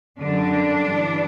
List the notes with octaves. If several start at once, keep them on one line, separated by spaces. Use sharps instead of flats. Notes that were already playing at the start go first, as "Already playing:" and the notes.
F#2 D3 G3 D4
G2 E3 G3